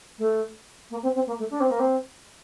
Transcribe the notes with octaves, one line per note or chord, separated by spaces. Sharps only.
A3
A#3
C4
C4
A#3
A3
D4
C4
A#3
C4